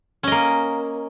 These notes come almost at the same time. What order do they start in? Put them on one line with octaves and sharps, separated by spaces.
C#4 D#5 A#3